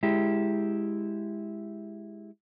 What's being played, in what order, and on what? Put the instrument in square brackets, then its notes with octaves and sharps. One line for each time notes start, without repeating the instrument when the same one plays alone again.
[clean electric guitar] G#3 E4 G4